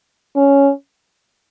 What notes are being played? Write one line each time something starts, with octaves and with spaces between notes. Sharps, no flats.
C#4